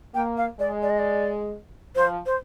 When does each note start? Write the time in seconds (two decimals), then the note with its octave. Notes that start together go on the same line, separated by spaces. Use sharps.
0.14 A#3 G5
0.37 F5
0.60 G#3 D5
0.82 D5
0.90 D#5
0.99 D5
1.96 F3 C5
2.26 C5